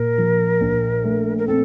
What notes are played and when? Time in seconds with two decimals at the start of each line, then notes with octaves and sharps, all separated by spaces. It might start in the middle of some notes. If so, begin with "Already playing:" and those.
Already playing: A#2 A#4
0.18 F3
0.61 A#1
1.04 A3
1.38 A#4
1.47 C4 A4